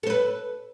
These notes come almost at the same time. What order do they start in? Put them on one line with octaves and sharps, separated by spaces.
A4 C5 B4